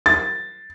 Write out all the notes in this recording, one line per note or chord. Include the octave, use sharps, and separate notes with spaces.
A6